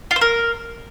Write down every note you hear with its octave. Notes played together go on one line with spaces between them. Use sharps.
F4
C5
A#4